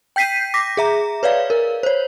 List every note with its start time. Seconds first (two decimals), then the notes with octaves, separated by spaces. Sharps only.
0.16 G5 G6 B6 C7 D#7
0.54 D6 A#6 B6
0.77 G#4 E5 A#5
1.23 B4 C#5 D5 F5
1.50 A#4
1.83 C5 C#5